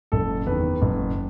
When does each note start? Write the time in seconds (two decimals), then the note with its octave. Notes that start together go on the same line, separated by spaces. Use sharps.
0.12 F#1 A4
0.47 E2 D#3 B4
0.82 F#1